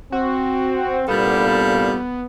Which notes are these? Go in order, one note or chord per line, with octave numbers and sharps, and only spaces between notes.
C4 F#4
C2 A#2 G3 B3 D4 A4 F5